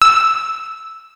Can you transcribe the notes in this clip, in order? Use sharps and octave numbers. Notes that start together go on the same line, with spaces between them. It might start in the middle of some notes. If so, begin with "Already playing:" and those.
E6